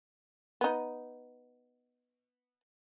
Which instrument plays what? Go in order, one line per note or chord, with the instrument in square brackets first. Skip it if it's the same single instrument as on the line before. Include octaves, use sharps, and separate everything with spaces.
[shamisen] B3 D#4